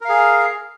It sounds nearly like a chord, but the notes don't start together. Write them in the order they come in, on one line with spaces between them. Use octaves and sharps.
A#4 F5 G#4